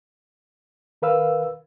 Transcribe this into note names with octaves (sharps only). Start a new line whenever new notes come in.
D#3 A#4 B4 F5 E6